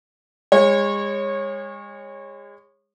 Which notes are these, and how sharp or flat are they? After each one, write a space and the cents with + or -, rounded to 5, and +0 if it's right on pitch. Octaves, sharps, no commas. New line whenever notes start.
G#3 -35 C#5 -20